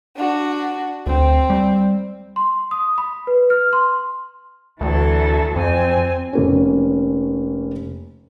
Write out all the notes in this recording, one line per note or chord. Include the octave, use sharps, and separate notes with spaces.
D4 F#4
D2 C4
G3
C6
D#6
B5
B4
F6
C6
D2 E3 F#3 A4
F2 C4 G#5
F1 A#3 C#4